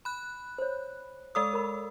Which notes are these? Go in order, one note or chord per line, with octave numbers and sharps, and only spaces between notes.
B5 F#6
C5 C#5
G#3 A4 D5 F5 D#6 E6
A#4 B5